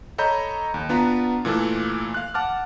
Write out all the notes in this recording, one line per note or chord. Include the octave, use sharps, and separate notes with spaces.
A4 C#5 D#5 A#5 B5 G6
D#2
B3 D4 F4 B4 A#5
A#2 E3 A3 A4
F5 F#6
F#5 A5 D6 F6